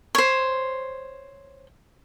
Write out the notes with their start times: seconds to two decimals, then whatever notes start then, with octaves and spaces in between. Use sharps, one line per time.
0.15 C5 C#5